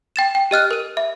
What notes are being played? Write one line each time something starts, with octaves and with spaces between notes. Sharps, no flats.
G5 A6 E7
G5
G4 D#5 F6 F#6
A#4 D#7
E5